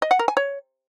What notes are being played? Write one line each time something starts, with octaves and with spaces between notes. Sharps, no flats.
D#5
F#5
A#4
G#5
C#5